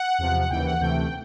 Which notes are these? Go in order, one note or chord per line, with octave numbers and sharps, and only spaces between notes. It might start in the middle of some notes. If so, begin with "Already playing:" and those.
Already playing: F#5
E2 C3 F3
F#5
D#2 C#3 E3 G5
F#5
D2 C3 E3 A3 G5